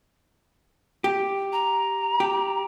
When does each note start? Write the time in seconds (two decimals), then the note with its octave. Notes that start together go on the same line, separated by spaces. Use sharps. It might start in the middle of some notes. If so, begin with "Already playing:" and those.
1.04 G4
1.53 A#5
2.20 G4